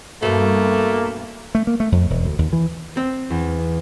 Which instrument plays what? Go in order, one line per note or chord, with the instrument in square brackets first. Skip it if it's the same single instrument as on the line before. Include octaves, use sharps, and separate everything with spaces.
[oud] G2 B2 [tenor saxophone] A3 [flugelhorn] A#3
[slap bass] A3
A#3
A3
F2
E1
D2
D#2
E3
[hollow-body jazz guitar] C4
[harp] E2